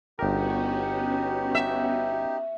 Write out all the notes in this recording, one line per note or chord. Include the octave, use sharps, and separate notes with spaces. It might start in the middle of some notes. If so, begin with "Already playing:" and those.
G1 B3 C#4 D#4 F#4 G4 A#4
E5